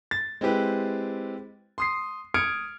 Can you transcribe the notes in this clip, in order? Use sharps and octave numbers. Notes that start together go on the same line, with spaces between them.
A6
G#3 C4 E4 G4 B4
C6 D#6 C7
D#6 F6 G#6 C#7 D7